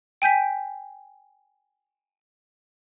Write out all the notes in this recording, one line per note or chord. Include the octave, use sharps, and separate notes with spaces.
G5 G#5 G6 B6